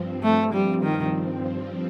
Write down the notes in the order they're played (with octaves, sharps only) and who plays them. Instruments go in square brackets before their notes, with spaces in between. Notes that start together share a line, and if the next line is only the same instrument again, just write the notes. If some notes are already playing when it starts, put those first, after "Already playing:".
Already playing: [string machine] G2 F3 C4
[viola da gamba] A3
G3
D#3